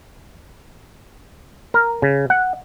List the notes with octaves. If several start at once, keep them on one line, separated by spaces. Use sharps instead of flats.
A#4
C#3
F#5